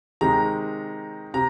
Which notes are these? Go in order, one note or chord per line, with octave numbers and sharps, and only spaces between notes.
C3 D#3 G#3 A#5
C3 A#5